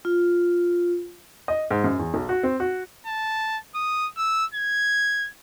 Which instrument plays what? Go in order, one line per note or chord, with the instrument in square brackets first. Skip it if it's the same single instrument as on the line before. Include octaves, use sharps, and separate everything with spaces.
[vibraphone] F4
[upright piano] D#5
G#2
F#2
E2
B1
F#4
C4
F#4
[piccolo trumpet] A5
D#6
E6
G#6